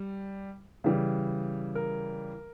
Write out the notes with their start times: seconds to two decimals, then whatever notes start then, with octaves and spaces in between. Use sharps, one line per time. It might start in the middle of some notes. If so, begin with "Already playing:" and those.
Already playing: G3
0.84 C#3 E3 G3
1.75 A#4